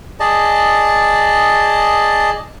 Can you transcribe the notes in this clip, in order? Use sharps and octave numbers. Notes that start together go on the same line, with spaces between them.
G#4 D5 D#5 A5